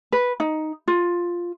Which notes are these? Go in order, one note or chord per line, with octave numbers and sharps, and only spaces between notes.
B4
D#4
F4